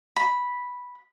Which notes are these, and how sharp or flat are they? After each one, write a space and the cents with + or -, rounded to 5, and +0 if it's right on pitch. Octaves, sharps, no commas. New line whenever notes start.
B5 -5